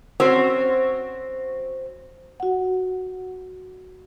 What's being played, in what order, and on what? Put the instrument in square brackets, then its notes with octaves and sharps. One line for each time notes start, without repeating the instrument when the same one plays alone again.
[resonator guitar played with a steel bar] C4 C#4 F#4 C5 C#5
[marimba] F#4 F#5